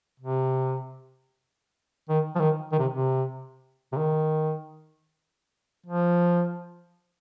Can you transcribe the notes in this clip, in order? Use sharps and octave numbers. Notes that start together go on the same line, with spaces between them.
C3
D#3
F3
D#3
D#3
C3
C3
C3
D#3
F3